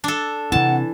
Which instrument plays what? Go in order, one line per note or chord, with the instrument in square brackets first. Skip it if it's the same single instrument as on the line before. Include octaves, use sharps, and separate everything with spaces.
[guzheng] D4 A4
[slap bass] C3 C4 [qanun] E3 [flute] F#5 [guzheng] A5